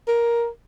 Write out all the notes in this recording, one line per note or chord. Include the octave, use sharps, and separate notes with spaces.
A#4